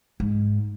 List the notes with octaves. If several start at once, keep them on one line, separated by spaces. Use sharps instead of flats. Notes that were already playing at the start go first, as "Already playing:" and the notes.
G#2